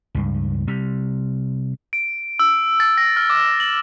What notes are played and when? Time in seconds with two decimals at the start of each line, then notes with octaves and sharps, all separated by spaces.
0.15 C#2 G2
0.67 C3 G3
1.93 D7
2.39 E6
2.80 A6
2.97 A#6
3.17 F6
3.30 D6
3.60 F#7